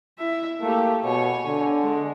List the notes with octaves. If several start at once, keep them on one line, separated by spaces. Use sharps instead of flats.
E4 E5
A3 A#3 G4
B2 C#5 G#5
D3
G#3